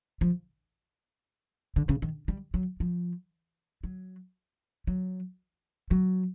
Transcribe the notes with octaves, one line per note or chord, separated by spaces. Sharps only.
F3
D3
C#3
D#3
G3
F#3
F3
F#3
F#3
F#3